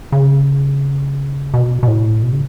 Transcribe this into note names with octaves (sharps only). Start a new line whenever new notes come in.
C#3
B2
B2
A2
B2
C#3